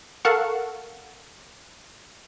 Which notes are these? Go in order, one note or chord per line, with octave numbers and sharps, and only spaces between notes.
A4 A#4 F5 F#5 C#6